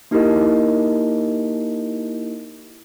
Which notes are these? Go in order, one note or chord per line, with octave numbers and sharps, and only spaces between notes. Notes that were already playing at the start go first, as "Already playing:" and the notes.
A#3 D#4 E4 G4 A#4 D#5